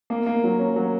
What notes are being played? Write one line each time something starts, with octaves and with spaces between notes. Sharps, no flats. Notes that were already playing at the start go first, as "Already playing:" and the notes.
A#3
A#3
F#3
C#4
F#3